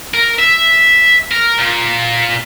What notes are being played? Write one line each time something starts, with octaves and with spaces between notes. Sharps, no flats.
A#4
E5
A#4
A#2